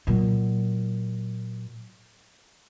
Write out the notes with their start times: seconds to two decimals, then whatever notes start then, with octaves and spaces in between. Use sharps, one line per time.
0.07 A#2 F#3